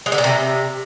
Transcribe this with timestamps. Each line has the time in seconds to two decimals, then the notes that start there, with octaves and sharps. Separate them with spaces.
0.06 G#3
0.12 D3
0.18 A#2
0.24 C3